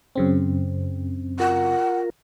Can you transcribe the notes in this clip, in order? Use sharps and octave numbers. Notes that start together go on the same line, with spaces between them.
F#2 C#3 C4
F4 A#4 F#5